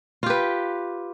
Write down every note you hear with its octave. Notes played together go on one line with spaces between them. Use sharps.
F4 G4 B4